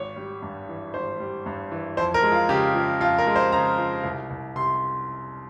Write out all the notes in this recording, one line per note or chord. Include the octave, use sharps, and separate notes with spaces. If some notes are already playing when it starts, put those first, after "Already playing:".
Already playing: G#1 C#5
G3
G2
E3
G#1 C5
G3
G2
E3
F2 C5
A#4
G#3
F4
C#3 G4
F3
F2 F4
A#4
G#3
C5
C#3 A#5
F3
C2
C2
C3 C6